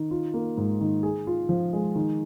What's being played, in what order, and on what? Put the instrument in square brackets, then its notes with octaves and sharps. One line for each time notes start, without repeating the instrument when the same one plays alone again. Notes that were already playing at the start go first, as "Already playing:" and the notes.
Already playing: [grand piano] D#3
F4
A#3
G#2
D#3
G#4
F4
F3
G#3
D#3